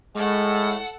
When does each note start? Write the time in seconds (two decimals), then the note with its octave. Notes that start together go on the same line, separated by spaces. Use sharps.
0.15 A2 G#3 A4 F#5